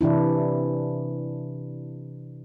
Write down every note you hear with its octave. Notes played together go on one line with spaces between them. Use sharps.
C3 E3 D4 E4